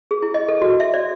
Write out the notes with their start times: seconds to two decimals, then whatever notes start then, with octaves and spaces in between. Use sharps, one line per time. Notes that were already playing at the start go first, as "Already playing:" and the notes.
0.11 G#4
0.22 E4
0.34 D#5
0.48 A4
0.62 F#4
0.80 E5
0.94 D5